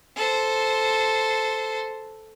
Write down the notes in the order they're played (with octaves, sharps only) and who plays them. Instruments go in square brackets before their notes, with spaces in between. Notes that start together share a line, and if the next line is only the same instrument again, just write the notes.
[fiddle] A4 C5